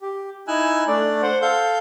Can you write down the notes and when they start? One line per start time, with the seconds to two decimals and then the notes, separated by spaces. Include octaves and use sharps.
0.01 G4
0.47 D#4 E4 G#5 E6 F#6
0.87 A3 D4 D5
1.23 C5 F#5
1.42 A4 F5 G6